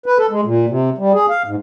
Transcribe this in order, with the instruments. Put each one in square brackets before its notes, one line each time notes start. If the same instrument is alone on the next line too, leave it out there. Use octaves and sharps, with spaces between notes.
[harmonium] B4
A4
G#3
A#2
C3
G3
G#4
F5
G#2